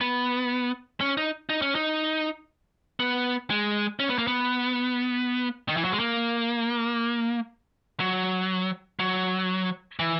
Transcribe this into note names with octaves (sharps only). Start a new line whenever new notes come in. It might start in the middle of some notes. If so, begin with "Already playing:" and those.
B3
C#4
D#4
D#4
C#4
D#4
B3
G#3
C#4
B3
A#3
B3
D#3
E3
F#3
G#3
A#3
F#3
F#3
E3